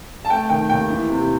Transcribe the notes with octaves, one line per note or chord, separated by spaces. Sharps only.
A5
A3 G5
D#3 G5
D#2 G5
E3
C3